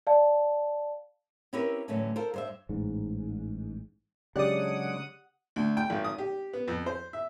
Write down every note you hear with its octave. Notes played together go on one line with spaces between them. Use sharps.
D5 F5 A5
C4 C#4 E4 G4 A#4 B4
A2 D3 E3 F#3 A3 C#4
F4 A4 A#4 C5
G2 C5 E5
A1 G#2
C#3 F#3 G#3 D4 G4 D5 F#5 D#6
D2
G5
G#1
D#6
G4
B3
F2
C5
E5